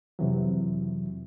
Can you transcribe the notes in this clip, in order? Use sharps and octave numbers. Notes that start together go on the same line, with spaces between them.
F2 C3 E3 F#3